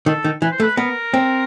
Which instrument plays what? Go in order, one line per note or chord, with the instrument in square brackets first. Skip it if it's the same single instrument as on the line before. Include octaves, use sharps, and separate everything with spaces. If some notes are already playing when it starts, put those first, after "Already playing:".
[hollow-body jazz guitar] D#3 [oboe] A4
[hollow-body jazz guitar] D#3
[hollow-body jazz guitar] E3 [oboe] B4
[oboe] C5
[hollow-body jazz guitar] A3 [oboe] B4
[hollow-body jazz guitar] B3 [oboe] A#4
[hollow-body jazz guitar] C4